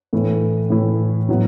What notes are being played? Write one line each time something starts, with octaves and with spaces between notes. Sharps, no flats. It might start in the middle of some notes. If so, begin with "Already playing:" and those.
A2 E3 A3 E4
A2 E3 A3 E4
A2 F#3 B3 E4